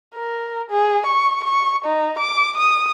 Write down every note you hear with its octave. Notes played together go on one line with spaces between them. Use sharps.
A#4
G#4
C#6
C#6
D#4
D6
D#6